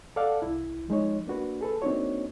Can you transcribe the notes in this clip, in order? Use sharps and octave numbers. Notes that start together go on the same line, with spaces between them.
A4 D5 F5 F#5
C2 E4
F3 G#3 D#4 C#5
A#3 D4 F#4 B4
G#4 A4 B4
A#3 C4 D4 D#4 F#4 C#5